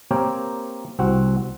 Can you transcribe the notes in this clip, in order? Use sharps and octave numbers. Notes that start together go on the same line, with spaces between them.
A#3 C4 G4 A#4 C#5 G5
C2 C4 F#4 F#5